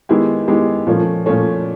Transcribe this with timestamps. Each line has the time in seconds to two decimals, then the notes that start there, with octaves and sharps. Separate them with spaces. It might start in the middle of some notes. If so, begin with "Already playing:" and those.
0.09 D#3 G#3 B3 E4 G4
0.48 D#3 G#3 B3 E4 G4
0.87 A#2 F3 A3 C#4
1.26 A#2 F3 A3 C#4